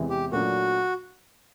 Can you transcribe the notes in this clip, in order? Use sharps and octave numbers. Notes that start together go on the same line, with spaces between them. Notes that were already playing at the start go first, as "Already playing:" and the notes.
Already playing: E2 C3 E3 G#3 C4
G4
A#2 F#3 A3 D4 F#4